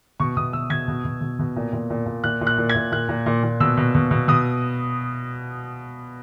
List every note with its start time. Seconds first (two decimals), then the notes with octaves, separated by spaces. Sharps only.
0.20 B2 C#6
0.37 B2 D#6
0.53 B2 E6
0.70 B2 G#6
0.88 B2
1.05 B2
1.21 B2
1.39 B2
1.56 A#2
1.73 A#2
1.90 A#2
2.06 A#2
2.24 A#2 F#6
2.41 A#2
2.47 F#6
2.58 A#2
2.69 G#6
2.75 A#2
2.92 A#2 F#6
3.09 A#2
3.26 A#2
3.43 A#2
3.60 B2 E6
3.77 B2
3.95 B2
4.11 B2
4.28 B2 D#6